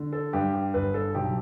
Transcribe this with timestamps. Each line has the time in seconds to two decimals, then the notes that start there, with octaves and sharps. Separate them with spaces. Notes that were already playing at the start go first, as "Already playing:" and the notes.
Already playing: D3
0.13 A4
0.33 G2 G4
0.54 G4
0.74 G1 B4
0.94 A4
1.15 B1 G4